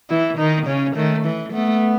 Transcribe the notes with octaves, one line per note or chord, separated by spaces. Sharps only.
E3 E4
D#3 D#4
C#3 C#4
D#3 A3
E3
A3 B3